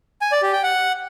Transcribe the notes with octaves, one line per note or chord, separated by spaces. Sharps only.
G#5
D5
G4
G5
F#5